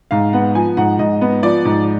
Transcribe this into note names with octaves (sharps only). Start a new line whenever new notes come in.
G#2 F5
B3 F#5
F3 G#5
G#2 F#5
G#2 D#5
B3
F3 D5
G#2